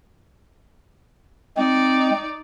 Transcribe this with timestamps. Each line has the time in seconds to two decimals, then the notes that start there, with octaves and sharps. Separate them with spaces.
1.57 G#3 C4 D#4 D5